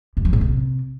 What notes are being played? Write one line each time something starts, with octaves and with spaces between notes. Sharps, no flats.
F#2
F3
A2
C3